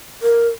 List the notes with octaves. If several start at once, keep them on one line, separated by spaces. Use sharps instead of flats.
A#4